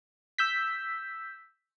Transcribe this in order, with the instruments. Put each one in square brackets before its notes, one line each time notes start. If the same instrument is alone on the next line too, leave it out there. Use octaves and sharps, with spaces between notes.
[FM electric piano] E6 G6 B6